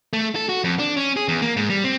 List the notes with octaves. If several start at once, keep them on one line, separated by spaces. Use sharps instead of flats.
A3
A4
F#4
F2
D4
C#4
G#4
E2
A#3
G#2
G3
C4